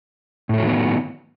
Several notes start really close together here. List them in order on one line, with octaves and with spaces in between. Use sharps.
A2 A3 F#3 D#3 B3